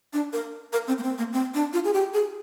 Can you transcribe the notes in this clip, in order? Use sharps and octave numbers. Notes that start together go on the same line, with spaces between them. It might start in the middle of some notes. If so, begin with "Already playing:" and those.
D4
A#4
A#4
C4
A#3
C4
A#3
C4
D4
F4
G#4
G4
G#4